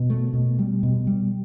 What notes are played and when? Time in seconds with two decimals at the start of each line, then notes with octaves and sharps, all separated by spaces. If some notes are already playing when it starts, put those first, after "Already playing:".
Already playing: B2
0.10 A3
0.34 B2
0.59 G3
0.83 B2
1.07 G3